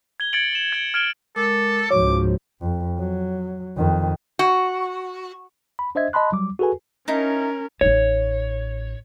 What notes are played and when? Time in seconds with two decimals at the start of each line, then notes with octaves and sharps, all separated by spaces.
0.20 G#6 G7
0.33 G#6 A6 C#7 D7 F#7
0.53 E7 F#7
0.73 G#6 D7 G7
0.94 F6 G#6 D7 E7 G7
1.36 G#3 A4 A#4 D6
1.91 C#2 G#2 F3 F#4 C#5 D6
2.61 F2
2.99 F#3
3.76 F2 D#3
4.39 F#4
5.79 B5
5.95 D4 C5 D#5 E5 G#6
6.13 D#5 A5 B5 C6 F#6
6.32 F#3 G3 D6
6.59 F#4 G#4 A4 B4 G#5
7.08 C#4 D#4 E4 A#4 A5
7.81 A1 D#4 C#5